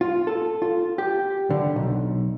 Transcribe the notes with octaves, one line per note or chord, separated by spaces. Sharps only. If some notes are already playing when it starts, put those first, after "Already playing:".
F4
A4
F4
G4
D3
B1